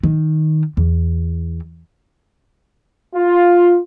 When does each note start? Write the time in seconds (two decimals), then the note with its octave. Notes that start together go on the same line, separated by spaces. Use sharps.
0.03 D#3
0.77 E2
3.15 F4